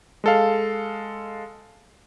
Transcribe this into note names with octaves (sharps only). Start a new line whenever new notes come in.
G#3 A4 F5